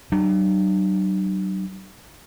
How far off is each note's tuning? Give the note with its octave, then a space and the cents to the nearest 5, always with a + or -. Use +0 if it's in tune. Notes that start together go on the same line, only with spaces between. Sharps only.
F#3 +45 D4 +45